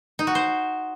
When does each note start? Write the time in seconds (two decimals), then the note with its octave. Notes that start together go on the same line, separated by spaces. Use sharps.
0.19 D#4
0.27 F#4
0.35 C5